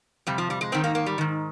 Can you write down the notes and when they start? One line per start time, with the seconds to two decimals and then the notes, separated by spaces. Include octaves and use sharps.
0.27 F2 C3 G3
0.38 F3
0.50 G3
0.61 G#3
0.72 G#2 D#3 C4
0.84 A#3
0.95 A#3
1.06 G3
1.18 G#2 D#3